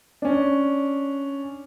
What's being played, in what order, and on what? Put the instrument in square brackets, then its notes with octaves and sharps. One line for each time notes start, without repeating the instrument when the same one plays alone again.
[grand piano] C#4 D4